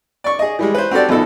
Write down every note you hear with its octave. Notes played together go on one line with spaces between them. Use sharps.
D5 C#6
G#4 D#5
E3 G3 G#3
B4 C5
C4 F#4 G4 A4 D5
A#1 B2 D#4 A4